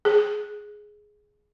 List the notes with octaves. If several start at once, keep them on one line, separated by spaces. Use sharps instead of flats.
G#4